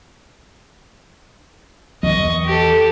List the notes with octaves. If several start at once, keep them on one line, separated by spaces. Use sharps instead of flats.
E2 D#5 C#6
G4 A4